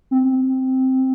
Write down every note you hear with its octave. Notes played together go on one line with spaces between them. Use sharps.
C4